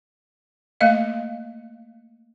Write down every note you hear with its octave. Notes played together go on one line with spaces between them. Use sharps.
A3 A#3 D#5 F5